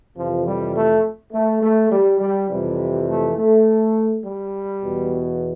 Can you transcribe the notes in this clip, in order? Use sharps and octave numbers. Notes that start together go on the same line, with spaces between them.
F2 C3 E3 F3
G3
A3
A3
A3
G3
G3
F2 C3 E3 G3
A3
A3
G3
E2 B2